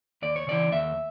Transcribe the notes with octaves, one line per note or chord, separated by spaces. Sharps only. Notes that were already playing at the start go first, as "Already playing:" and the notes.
D#2 D5
C#5
C#3 E3 D5
D#2 E5